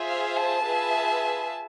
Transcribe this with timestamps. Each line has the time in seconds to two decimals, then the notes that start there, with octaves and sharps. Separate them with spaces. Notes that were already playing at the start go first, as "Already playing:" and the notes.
Already playing: F4 G#4 C5 E5
0.08 F5
0.36 A5
0.65 F4 G#4 B4 E5